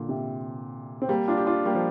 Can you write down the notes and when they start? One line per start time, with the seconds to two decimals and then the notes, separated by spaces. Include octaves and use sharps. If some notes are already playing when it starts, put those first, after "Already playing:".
Already playing: A#2 D3
0.09 C3
1.02 C4
1.08 G3 A#3
1.28 D4 F4
1.38 G4
1.47 D4 F4
1.65 G3 A#3
1.75 F3